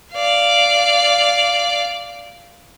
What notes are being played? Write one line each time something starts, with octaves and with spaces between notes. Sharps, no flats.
D5 F5